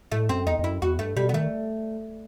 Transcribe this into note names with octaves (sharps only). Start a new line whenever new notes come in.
A2 A3
F#2 C4
E2 D#4
E2
F#2 E4
E2 F#4
G2 A3
B2 G3
B3
D#3 A3